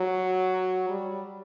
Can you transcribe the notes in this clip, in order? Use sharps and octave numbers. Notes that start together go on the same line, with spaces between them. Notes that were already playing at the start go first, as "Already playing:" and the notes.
Already playing: F#3
G3